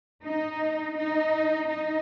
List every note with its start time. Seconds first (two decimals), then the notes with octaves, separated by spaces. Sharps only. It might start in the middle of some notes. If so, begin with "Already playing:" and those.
0.24 D#4
0.97 D#4
1.69 D#4